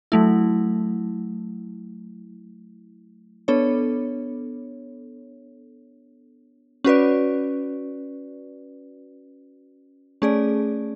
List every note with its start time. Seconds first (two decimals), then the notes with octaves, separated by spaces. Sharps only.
0.12 F#3 A3 E4
3.48 B3 D4 A4 C#5
6.84 C#4 F#4 B4 D5
10.22 A3 C#4 G#4 D5